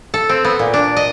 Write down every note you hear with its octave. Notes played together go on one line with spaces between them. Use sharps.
A4
C4
B3
A#2
D4
D#5